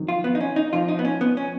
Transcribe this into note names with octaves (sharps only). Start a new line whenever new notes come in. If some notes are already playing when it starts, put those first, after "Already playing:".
Already playing: F2 D#3 F#3
F4
B3
D#4
C#4
D#4
F2 F3 F4
D#4
B3
C#4
B3
C#4